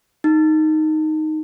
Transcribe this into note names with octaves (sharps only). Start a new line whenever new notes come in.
D#4